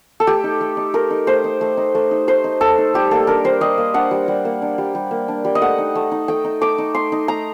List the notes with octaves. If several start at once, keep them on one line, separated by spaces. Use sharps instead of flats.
A4
A3 G4
D#4
A3
D#4
A3 A#4
D#4
A3 C5
D#4
A3
D#4
A3
D#4
A3 C5
D#4
A3 A4
D#4
G3 G4
A#3 A4
D4 A#4
G3 C5
G3 D#5
A#3
D4 F#5
G3
G3
A#3
D4
G3
G3
A#3
D4
G3
D#5
A3 F#5
D#4
A3
D#4
A3 G5
D#4
A3 D6
D#4
A3 C6
D#4
A3 A#5